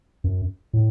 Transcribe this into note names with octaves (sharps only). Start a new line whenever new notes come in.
F#2
A2